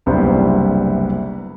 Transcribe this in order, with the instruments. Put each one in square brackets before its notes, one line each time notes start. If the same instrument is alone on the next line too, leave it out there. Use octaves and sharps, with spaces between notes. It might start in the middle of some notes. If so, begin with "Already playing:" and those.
[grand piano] F#1 C2 B3 D4 E4 C5